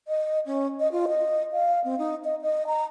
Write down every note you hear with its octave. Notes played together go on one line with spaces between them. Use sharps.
D#5
C#4
D#5
F4
D#5
F5
C4
D#4
D#5
D#5
A#5